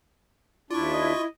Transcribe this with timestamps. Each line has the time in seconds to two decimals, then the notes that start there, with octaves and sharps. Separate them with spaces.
0.71 D#2 D4 E4 F4 D5 C#6
0.93 D#5